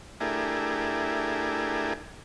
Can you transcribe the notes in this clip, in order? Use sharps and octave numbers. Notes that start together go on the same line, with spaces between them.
A3 D4 E4 G4 G#4 A#4